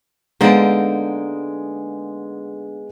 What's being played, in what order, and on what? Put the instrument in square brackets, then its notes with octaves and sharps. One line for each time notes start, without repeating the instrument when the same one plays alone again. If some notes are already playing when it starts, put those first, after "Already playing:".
[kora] D3 C5 [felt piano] G#3 B3 D7 [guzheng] A#3 D#4 A5